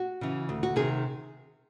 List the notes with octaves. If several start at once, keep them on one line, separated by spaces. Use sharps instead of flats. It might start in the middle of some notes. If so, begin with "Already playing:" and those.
Already playing: F#4
C#3 E3
D2
F#4
C3 D#3 G#4